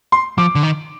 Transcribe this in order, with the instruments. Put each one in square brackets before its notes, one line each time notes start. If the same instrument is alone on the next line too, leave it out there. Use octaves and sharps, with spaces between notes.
[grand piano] C6
[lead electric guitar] F3 [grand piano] D6
[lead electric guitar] D3
D#3